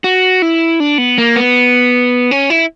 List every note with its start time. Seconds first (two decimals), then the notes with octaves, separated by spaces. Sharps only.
0.04 F#4
0.42 E4
0.80 D4
0.98 B3
1.18 A#3
1.36 B3
2.31 C#4
2.50 E4